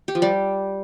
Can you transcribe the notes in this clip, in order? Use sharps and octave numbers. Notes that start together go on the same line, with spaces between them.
G4
F3
G3